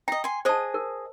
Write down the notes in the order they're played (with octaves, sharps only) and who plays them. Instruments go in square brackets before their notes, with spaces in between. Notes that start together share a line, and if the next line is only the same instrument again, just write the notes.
[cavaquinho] D#5 A#5 [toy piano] G5
[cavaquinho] G#5 C6
[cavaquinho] G#4 D#5 D#6 [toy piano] C5 A5
[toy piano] A#4